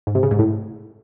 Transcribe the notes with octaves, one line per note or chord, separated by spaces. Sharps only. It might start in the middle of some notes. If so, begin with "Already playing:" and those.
G#2
C3
C#3
G#2
A2